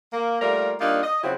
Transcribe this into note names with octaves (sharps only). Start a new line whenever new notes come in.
A#3
G3 A3 A#3 F4 A#4
G3 A#3 D4 D#4 F4
D#5
C#3 F3 F#3 C4 E4 F#4